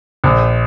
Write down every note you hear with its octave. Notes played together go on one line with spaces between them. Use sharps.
A#1